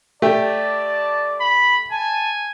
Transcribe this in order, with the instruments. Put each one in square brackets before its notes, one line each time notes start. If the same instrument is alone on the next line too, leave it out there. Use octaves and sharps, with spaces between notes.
[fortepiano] A3 G4 [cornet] D5 [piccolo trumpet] A5
[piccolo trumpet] B5
[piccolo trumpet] G#5 [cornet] A5